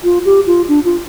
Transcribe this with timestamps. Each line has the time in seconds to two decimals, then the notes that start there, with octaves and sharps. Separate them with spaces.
0.04 F4
0.25 G4
0.47 F4
0.69 D4
0.85 F4